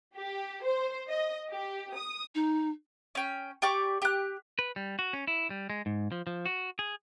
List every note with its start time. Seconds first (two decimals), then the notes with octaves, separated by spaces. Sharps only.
0.16 G4
0.63 C5
1.08 D#5
1.50 G4
1.94 D#6
2.35 D#4
3.15 C#4 G5
3.62 G4 D5 C#6 D6
4.02 G4 F#6
4.59 B4
4.76 G3
4.99 F#4
5.13 C#4
5.27 E4
5.50 G3
5.70 G#3
5.86 G#2
6.12 F3
6.27 F3
6.46 F#4
6.79 G#4